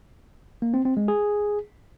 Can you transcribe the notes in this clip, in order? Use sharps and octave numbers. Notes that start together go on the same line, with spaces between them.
A#3
C4
C4
G#3
G#4